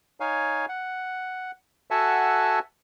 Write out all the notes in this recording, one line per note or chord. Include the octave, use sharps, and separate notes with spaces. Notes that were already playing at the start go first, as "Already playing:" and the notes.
D#4 C#5 F5 G#5
F#5
F#4 A4 E5 F#5 G#5 A5